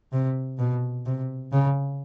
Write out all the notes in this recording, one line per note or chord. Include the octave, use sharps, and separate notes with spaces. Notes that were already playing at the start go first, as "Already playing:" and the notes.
C3
B2
C3
C#3